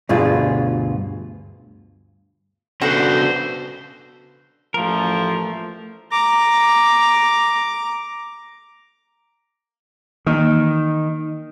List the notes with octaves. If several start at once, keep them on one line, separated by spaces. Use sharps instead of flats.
D2 G2 B2 F4 G#4
C#3 B3 D4 F#4 A4 B4 C5
A1 F3 A3 A#4
A#5 D6
D#3 E3 A#3